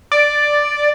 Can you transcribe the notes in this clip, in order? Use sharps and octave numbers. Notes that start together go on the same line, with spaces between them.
D5